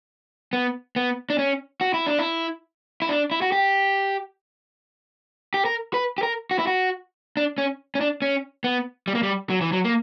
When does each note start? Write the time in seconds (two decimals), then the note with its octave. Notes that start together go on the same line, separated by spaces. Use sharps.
0.53 B3
0.96 B3
1.30 D4
1.39 C#4
1.81 F#4
1.94 E4
2.07 D4
2.19 E4
3.02 E4
3.09 D4
3.31 E4
3.42 F#4
3.52 G4
5.54 G4
5.65 A#4
5.94 B4
6.18 G4
6.23 A#4
6.51 F#4
6.59 E4
6.67 F#4
7.37 D4
7.58 C#4
7.95 C#4
8.01 D4
8.22 C#4
8.64 B3
9.08 G3
9.15 A#3
9.23 G3
9.50 F#3
9.61 E3
9.72 F#3
9.84 A#3